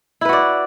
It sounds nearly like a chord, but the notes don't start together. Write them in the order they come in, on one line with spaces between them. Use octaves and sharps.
E4 B4 F#4 D5